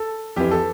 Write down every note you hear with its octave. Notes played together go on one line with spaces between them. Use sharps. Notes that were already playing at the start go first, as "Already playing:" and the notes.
Already playing: A4
F2 E3 G4
A4